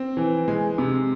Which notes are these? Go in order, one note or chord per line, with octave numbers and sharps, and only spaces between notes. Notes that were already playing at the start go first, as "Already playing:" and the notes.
Already playing: C4
E3
G#3
C3